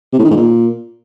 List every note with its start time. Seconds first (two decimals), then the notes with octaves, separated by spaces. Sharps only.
0.13 C3
0.19 A2
0.25 D#3
0.30 G#2
0.36 A#2